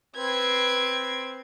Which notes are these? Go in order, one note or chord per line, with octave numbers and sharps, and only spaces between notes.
C4 B4 G#6